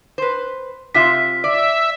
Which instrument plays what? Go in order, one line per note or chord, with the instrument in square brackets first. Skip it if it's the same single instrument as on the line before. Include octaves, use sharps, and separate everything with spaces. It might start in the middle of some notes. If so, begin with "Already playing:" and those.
[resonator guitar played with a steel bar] B4 C5
[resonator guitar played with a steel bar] C3 F4 E5 [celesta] B6
[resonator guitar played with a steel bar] D5 [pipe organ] E5